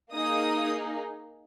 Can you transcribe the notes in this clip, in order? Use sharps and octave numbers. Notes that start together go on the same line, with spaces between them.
A#3 D#4 G#4 D#6